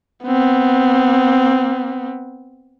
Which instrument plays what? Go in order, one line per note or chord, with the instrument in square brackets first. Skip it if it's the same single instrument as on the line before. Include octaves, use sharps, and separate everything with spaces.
[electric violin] B3 C4